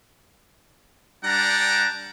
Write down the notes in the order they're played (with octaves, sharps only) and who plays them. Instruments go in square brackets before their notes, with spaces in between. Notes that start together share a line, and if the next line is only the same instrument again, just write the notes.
[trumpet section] G3 D4 F#5 G5 A5 A#5